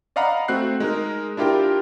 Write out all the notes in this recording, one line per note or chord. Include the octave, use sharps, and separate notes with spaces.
D5 D#5 F5 F#5 A#5 B5
A3 C4 F#4 F#6 C7
G#3 D#4 A#4
D4 E4 F4 G4 A#4 G5